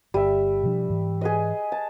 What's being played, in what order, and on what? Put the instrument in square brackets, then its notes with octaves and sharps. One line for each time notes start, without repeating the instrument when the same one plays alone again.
[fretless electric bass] G1 [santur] G3 E5
[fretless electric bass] B2 F3 D4
G#2 E3
[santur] G#4 B4 D#5
A5